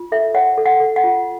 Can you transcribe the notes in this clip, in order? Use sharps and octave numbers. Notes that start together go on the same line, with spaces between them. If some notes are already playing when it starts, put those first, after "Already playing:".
Already playing: F4
A4 E5
C#5 F#5
A4
F#5
A4
F#5
F4